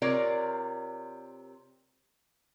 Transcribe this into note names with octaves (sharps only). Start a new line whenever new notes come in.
C3 F4 A#4 C#5 D5